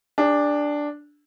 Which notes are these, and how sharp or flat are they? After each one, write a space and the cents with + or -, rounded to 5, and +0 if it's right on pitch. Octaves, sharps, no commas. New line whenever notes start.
D4 +0 G#4 -40